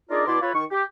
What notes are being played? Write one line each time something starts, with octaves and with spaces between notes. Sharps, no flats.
D4 D#4 F4 G#4 A#4 D5
B2 E4 D5 C6
F4 A4 B4 C#5
D#3 C#6
G4